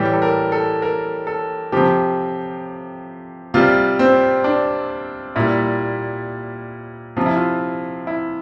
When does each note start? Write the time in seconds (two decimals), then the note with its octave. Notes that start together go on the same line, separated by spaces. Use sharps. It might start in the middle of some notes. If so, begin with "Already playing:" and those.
Already playing: A2 E3 G3 G4
0.13 A4
0.22 A#4
0.52 A4
0.82 A#4
1.27 A4
1.72 C3 F3 G4
3.54 C3 G3 F4
3.99 C4
4.44 D4
5.36 A#2 G3 E4
7.17 C3 F3 F4
7.26 E4
7.36 F4
8.07 E4